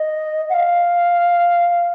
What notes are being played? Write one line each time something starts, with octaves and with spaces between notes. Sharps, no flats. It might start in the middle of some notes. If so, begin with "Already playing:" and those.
Already playing: D#5
F#5
F5